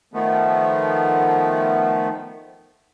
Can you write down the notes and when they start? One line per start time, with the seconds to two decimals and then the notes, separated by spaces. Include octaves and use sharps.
0.14 D#3 F3 A3 B3